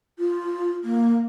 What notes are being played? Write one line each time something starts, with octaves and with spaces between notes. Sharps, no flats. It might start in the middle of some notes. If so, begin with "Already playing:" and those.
F4
A#3